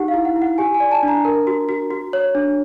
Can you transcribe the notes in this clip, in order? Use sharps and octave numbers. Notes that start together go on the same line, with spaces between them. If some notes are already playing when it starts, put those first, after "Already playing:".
Already playing: D#4 G4 F#5
F5
E4
F#5
E4
F#5
G4 G#5
G#5
D5
A5
D4
A#5
A#4
F#4
F#4
F#4
C#5
D4